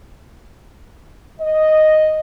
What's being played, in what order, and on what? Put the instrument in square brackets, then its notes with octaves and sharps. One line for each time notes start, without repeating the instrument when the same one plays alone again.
[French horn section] D#5